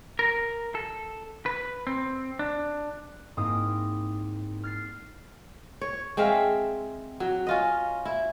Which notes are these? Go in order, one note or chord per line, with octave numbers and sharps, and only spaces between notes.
A#4
A4
B4
C4
D4
G#2 A#3 C4 E4 A#4 D#6
F6 A6 C7
C#5
G#3 C4 E5 F5
F#3
C#4 F4 D#5
E4